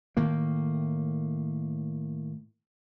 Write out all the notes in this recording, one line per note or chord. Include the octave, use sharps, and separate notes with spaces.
A2 D#3 A#3